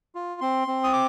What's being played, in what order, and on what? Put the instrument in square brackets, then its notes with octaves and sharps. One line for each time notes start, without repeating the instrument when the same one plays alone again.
[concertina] F4
C4 C6
C4
D#6
D6